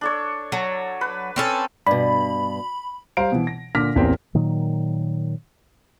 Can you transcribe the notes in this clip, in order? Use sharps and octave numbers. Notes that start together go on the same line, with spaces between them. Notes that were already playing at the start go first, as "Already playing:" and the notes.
D4 A4 C#5
F#3 A4
B4
C4 C#4 A4
G2 B2 B5
G3 C5 F5 A#5 D7
B2 E3
A#6
A#2 D3 D6 F6 A#6 B6
A1 E2 A#3 C4 G4
A#2 D#3 F#3